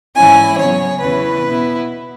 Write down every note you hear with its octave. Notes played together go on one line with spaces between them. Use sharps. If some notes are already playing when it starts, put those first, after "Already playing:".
G#2 E3 C#4 E4 G#5
C#3 F#3 B3 C#5
E2 C#3 E3 C#4 E4 B4
B2 B3 E4